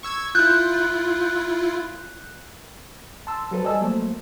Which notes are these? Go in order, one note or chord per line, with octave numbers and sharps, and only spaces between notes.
C#6 E6 G#6
E4 F4 F#6 G6
A5 C6 E6
F#3 F#4 A4 B4 C5
G3 D5 D#5 G#5 A5 E6
F#3 A3 A#3 C5